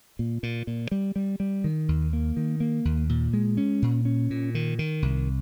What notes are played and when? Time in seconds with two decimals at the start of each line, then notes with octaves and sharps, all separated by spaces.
0.19 A#2
0.43 A#2
0.67 A#2
0.91 G3
1.16 G3
1.40 G3
1.64 D#3
1.88 D#2
2.13 A#3
2.37 D#3
2.60 A#3
2.85 D#2
3.09 A#2
3.33 G#3
3.57 C#4
3.82 A#2
4.05 C#4
4.30 A#2
4.55 D#3
4.79 D#3
5.02 C2